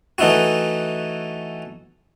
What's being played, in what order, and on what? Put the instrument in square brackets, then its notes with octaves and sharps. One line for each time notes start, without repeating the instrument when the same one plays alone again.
[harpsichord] E3 A3 D#4 E4 F#4